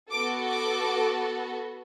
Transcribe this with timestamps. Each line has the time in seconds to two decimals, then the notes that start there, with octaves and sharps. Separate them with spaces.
0.11 B3 F#4 A4 D6
0.48 D6